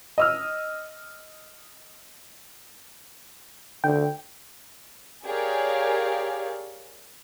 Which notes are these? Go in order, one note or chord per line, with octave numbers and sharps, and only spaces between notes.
D#5 E6 F6
D3 G5
G4 G#4 A#4 C#5 D5 F5